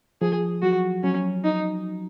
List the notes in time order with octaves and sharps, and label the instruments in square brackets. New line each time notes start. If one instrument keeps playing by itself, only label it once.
[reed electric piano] F3 [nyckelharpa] G#4
[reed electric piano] F#3 [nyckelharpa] F#4
[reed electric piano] F#3 [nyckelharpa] C#4
[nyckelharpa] D#4